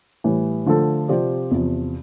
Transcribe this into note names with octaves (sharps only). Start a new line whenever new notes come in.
A2 E3 G3
D3 F3 A3 D4 A4
C3 F3 C4 G4 D5
E2 C3 F3